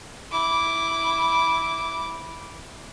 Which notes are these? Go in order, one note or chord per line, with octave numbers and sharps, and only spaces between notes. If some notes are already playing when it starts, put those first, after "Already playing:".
E4 D6